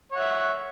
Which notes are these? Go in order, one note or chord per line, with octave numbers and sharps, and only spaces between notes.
C#5 E5 F#5